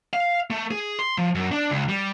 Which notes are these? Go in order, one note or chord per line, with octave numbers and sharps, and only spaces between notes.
F5
A3
G#4
C6
F3
F#2
D4
C#2
G3